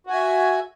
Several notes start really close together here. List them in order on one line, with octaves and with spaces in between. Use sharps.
F#4 G#5 E5